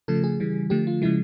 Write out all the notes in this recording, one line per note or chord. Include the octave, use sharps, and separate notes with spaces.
C#3 F3 A3 A4
G#4
C#3 E3 G3
D3 F3 A3 G4
F4
C#3 F3 G#3 E4